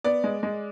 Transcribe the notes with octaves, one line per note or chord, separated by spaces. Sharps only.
B3 D5
G#3
G#3